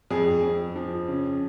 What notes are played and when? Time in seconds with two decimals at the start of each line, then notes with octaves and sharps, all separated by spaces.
0.10 F2 G#4
0.43 F2
0.76 F3
1.08 C#3